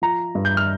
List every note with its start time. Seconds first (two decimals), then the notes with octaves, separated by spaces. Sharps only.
0.02 F3 A#5
0.35 G2
0.45 G6
0.57 F6